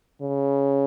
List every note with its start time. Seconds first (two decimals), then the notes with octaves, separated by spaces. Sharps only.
0.22 C#3